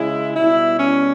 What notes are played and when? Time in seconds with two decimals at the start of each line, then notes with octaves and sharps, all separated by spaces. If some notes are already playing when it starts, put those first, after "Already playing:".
Already playing: C#3 G#3 E4
0.35 B2 G3 E4
0.79 C#4